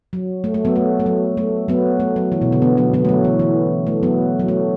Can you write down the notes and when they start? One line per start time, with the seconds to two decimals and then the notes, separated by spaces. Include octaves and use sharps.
0.13 F#3
0.44 A3
0.54 A3
0.65 F#3 B3
0.76 A3
0.99 A3
1.06 F#3
1.37 A3
1.68 F#3 B3
2.00 A3
2.16 F#3
2.32 E3
2.42 B2
2.52 D3
2.62 B3
2.77 F#3 B3
2.94 F#3 B3
3.05 A3
3.09 F#3
3.24 E3
3.39 E3
3.87 A3
4.03 F#3 B3
4.40 F#3
4.48 A3